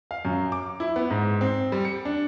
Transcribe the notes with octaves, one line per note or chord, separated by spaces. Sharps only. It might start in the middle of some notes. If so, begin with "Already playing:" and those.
F5
F#2
D6
E4
B3
G#2
C4
G3
C#7
D4